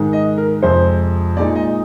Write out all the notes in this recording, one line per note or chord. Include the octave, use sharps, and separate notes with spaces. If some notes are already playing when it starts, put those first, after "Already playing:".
Already playing: G#2 D#3 G#3
D#5
A#4
F2 C3 F3 G#3 C5
A#2 G#3 D#4 D5
D#5